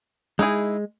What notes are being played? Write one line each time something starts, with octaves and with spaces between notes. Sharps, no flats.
G#3 D#4 E4 G#4